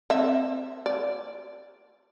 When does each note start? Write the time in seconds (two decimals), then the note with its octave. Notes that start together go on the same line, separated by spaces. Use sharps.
0.10 C4 E5
0.86 D5